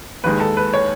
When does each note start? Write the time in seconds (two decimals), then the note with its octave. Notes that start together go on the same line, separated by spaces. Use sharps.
0.24 D#2 D#3 G#3 B4
0.40 A4
0.57 B4
0.74 C#5